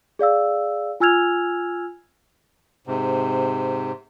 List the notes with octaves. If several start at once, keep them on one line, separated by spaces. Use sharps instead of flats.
G#4 D5 F5 E6
F4 G#5 E6 F6 G#6 F7
G#2 C3